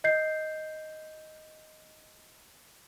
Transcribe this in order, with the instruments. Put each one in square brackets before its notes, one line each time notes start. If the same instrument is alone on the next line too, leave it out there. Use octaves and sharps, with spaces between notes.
[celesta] D#5 G6 C7